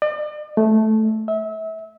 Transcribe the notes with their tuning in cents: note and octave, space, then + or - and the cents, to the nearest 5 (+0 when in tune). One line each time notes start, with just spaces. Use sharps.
D5 +45
A3 -10
E5 -30